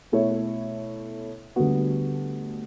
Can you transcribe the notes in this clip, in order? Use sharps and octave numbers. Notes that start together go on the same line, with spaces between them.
B2 A3 E4 A4 C#5
D2 D3 G3 B3 F#4